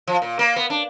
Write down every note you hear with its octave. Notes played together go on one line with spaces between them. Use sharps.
F3
A#2
A#3
B3
D4